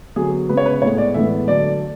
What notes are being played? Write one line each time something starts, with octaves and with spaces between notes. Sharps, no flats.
D3 F#3 B3 G#4
C#3 G#3 B3 B4
C#5
B4
A2 G#3 B3 C#5
D5
A2 E3 G#3 B3 E5
D3 F#3 A3 D5